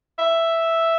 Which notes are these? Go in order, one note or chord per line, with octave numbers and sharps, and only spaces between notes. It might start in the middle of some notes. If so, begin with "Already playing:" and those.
E5